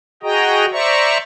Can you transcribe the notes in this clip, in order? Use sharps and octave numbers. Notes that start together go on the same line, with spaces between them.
F#4 G#4 D#5 G5 A#5
C5 D5 E5 A#5 C#6